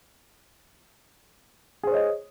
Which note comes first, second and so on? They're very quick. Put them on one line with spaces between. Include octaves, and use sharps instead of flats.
G#4 C5 C#5 D#5